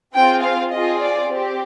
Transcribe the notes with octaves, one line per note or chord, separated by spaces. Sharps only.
C4 F4 G#4 G5
F5
C4 F4 G#4 D#5
D5
C4 G4